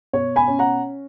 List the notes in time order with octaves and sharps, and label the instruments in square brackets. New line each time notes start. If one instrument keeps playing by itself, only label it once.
[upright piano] B2 C#5
G#5 B5
C#4
F#5 A#5